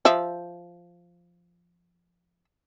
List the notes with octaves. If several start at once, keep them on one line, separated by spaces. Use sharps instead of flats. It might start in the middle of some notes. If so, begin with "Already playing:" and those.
F3 E5